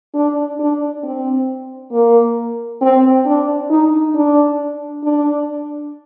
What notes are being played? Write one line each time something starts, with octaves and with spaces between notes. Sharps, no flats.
D4
D4
C4
A#3
C4
D4
D#4
D4
D4